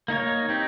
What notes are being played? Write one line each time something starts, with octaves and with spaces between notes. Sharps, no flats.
A#3 D#4 A#4 C#5
C4 D#4 G4